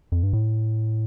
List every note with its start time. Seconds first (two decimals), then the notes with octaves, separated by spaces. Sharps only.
0.12 F2
0.23 G2
0.33 A2